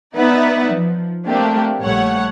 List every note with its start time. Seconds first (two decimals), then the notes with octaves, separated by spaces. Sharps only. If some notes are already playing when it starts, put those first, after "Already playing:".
0.16 B3 D#4 B4 D5 E5 F#5
0.73 F3
1.27 A3 A#3 C4 D4 G4
1.80 A#1 G3 A3 C#5 F#5